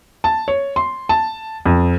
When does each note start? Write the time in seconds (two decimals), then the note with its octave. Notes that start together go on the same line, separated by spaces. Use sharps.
0.24 A5
0.48 C#5
0.76 C6
1.09 A5
1.66 F2